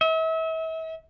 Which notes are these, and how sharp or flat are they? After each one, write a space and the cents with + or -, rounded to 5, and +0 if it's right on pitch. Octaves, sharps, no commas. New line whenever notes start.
E5 -40